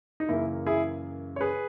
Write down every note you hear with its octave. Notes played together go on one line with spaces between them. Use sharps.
D#4
F#2 C#3 E3 A#3 E4
E4 G#4
C#5
G#4 B4